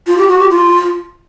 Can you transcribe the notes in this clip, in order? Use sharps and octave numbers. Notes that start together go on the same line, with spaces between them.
F4
G4
F#4
G4
F4